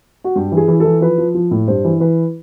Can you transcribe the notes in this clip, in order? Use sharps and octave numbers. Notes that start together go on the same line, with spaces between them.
F#4
G2 G4
E3
G#4
E3
E3 A4
F3 B4
F3
F3
A2
G2 C5
E3
E3 B4